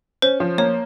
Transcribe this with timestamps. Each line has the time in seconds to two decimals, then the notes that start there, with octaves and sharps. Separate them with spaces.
0.22 C#4 C5
0.40 F3
0.58 A#3 C#5